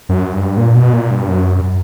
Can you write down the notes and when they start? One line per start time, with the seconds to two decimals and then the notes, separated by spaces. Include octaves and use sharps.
0.09 F#2
0.33 G2
0.57 A#2
0.75 B2
0.93 A#2
1.10 G2
1.28 F#2